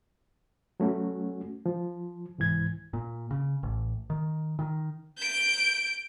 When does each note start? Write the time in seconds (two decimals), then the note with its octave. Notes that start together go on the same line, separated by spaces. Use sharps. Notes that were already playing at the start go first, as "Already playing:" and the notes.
0.80 F#3 A3 C#4 F#4
1.66 F3
2.38 C2 G#2 E3 G#6
2.93 A#2
3.31 C#3
3.63 A1
4.10 D#3
4.59 D#3
5.18 G6 D7